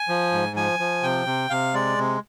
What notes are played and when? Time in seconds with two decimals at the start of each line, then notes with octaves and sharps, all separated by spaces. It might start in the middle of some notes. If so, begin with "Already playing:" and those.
Already playing: G#5
0.09 F3
0.32 G#2
0.56 F3 G#5
0.79 F3
1.03 C3 G5
1.26 C3
1.50 C3 F5
1.74 G#3 D5
1.98 C3